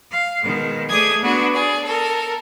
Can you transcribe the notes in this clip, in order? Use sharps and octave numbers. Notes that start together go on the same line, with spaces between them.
F5
B2 D#3 G#3
A3 G#4 D5 G#5 D#6 G#6
B3 D4 F#4
G#4 D5
A4 A#4